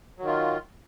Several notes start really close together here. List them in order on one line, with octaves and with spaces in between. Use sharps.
F#3 D#3 F4